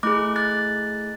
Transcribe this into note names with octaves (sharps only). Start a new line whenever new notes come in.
A3 E4 G#4 D6 F#6
F#6 A6